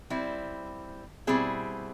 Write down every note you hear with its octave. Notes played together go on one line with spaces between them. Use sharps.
G3 C4 E4
B2 G3 C4 E4 G#4